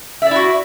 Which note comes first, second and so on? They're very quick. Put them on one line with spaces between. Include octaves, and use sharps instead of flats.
E5 D5 E4 F#4